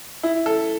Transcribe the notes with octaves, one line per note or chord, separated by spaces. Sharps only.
E4
A4